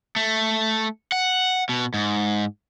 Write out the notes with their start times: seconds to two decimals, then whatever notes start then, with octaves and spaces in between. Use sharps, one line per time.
0.16 A3
1.12 F#5
1.69 B2
1.94 G#2